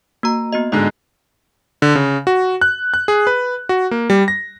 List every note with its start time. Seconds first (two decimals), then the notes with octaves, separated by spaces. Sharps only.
0.23 A#3 F#4 A#5
0.53 B3 F#4 D#5
0.72 G#2 D3 G#3 D#5
1.82 D3
1.95 C#3
2.27 F#4
2.61 F#6
2.94 F#6
3.08 G#4
3.27 B4
3.69 F#4
3.91 A#3
4.10 G3
4.28 A#6